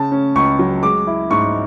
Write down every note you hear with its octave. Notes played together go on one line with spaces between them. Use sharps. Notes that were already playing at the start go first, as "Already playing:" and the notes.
Already playing: C#3 A5
C#4
C#2 C#6
F#3
G#3 D6
E4
G#2 C#6